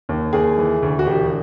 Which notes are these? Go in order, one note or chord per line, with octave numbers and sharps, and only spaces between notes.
D#2
D#2 G#4
E3
D2
F#4
E1 G4